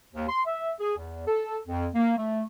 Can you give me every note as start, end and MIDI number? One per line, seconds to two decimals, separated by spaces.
0.14 0.27 39
0.29 0.42 84
0.46 0.72 76
0.80 0.96 68
0.98 1.25 40
1.27 1.59 69
1.67 1.86 41
1.95 2.16 58
2.17 2.42 57